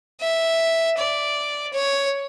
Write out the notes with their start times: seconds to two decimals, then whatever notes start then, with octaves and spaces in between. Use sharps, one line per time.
0.21 E5
0.97 D5
1.73 C#5